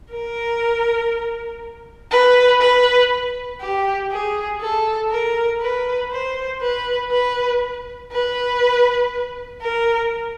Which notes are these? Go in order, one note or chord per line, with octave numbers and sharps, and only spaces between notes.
A#4
B4
B4
G4
G#4
A4
A#4
B4
C5
B4
B4
B4
A#4